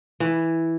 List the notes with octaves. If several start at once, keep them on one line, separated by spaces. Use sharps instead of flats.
E3